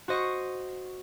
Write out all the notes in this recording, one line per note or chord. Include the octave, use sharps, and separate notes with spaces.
F#4 C5 D#5 C#6